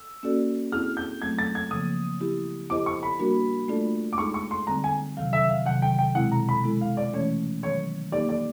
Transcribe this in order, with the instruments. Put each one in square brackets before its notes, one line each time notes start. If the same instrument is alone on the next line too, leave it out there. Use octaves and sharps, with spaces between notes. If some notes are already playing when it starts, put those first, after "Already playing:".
Already playing: [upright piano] E6
[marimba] A#3 C#4 F#4 A4 D5
[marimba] C4 E4 G#4 [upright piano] F6
[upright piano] G6
[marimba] F#3 A3 C4 [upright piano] G#6
[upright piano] A6
G#6
[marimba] C#3 F3 A#3 [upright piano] D#6
[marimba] B3 E4 G4
[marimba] B3 E4 G4 C5 D#5 [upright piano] D6
[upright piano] C#6
B5
[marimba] G3 A#3 D4 F#4 A#4
A3 D4 F4 A4 D5
[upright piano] D6
[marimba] G#3 B3 D#4 G#4 [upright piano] C#6
[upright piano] C#6
C6
[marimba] D3 G3 C4 [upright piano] A#5
[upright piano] G#5
[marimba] C3 D#3 F#3 [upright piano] F5
[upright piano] E5
F5
[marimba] C3 D#3 F#3 [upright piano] F#5
[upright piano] G5
G5
[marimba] B2 G#3 C4 E4 [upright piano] F#5
[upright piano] A#5
B5
[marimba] G#3 B3 E4 A4
[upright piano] F5
D5
[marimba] E3 A3 C#4 [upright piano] C#5
[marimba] D#3 F#3 B3 [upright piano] C#5
[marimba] A#3 D#4 G4 [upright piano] D5
[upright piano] D5